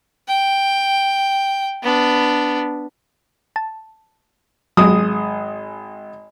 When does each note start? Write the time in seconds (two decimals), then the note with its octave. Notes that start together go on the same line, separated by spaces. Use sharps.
0.28 G5
1.83 B3 D4
3.56 A5
4.77 G#1 F#3 G#4 D#6